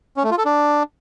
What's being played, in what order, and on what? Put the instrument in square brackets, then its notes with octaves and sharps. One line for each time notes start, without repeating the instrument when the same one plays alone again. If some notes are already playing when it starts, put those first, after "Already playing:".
[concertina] C#4
A3
F4
A4
D4